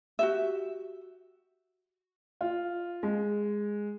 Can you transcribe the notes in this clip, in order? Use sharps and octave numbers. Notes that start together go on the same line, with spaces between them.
F#4 G4 E5
F4
G#3